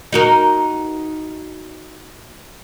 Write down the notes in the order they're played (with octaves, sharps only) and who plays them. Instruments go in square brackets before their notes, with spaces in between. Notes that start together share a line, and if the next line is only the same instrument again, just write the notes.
[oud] D#4 F#4 A#4